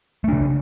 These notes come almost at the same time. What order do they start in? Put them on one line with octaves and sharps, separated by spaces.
A3 D4 C#3